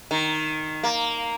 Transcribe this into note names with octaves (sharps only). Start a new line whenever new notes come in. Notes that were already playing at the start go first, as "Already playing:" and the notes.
D#3
A#3